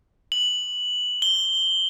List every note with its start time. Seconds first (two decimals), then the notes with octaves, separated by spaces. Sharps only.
0.32 F#7
1.22 G7